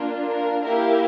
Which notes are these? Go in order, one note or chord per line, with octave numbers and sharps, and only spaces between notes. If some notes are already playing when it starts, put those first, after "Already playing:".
Already playing: A#3 D4 F4 A#4
A#4
A#3 E4 G4 A#4